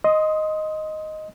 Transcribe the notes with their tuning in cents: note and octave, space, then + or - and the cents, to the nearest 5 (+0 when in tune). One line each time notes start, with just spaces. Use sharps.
D#5 +0 C6 +0 D#6 +20